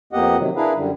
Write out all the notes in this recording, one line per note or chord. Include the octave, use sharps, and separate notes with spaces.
F2 A#3 B3 G4 D#5 F#5
C3 D#3 F#3
D4 E4 G#4 A#4 B4 F5
F#2 D3 G3